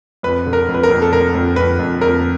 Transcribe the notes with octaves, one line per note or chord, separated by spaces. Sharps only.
F2 B4
D3
A#4
F2
B4
A#4
F2
A4
D3 A#4
F2
F2 B4
F2
F2 A#4